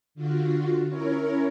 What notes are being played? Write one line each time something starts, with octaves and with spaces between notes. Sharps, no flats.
D3 F4 F#4
C#4 E4 A#4 C#5